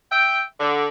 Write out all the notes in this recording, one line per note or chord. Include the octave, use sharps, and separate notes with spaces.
E5 G5
D3